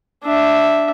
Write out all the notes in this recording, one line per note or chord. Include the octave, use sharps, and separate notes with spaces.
D4 E5